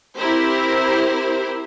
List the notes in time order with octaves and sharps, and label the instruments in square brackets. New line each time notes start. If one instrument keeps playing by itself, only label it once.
[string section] C4 E4 G4 A#4 C5